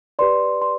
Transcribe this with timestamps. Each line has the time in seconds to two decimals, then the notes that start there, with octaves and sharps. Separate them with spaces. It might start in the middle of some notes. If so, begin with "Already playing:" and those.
0.19 G4 B4 D5 C6
0.62 C6